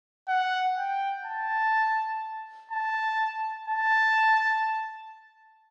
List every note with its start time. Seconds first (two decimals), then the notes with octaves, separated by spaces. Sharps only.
0.28 F#5
0.77 G5
1.25 A5
2.71 A5
3.68 A5